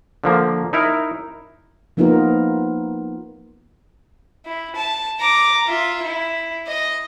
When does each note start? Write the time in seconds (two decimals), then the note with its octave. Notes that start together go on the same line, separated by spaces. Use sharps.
0.24 D3 F3 A#3
0.73 D#4 E4 A#4
1.97 F3 A#3 B3 D#4 F4 A#4
4.46 E4
4.76 A5
5.20 A#5 D6
5.67 F4 E5
6.02 E4
6.67 D#5